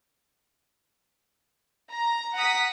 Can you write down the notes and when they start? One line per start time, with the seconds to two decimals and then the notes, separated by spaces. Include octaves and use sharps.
1.90 A#5
2.35 F#5 A#5 D#6 B6